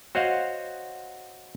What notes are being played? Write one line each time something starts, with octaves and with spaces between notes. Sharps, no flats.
F#4 C5 C#5 D#5 F5 F#5